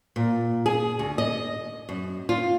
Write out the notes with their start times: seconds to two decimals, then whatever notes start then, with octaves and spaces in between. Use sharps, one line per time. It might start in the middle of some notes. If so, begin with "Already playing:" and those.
0.16 A#2
0.66 G#4
0.99 D2
1.18 D#5
1.89 F#2
2.29 F4